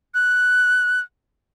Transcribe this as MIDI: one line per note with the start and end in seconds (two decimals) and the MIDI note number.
0.14 1.00 90